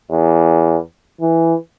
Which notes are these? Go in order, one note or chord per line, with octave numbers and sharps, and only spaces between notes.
E2
E3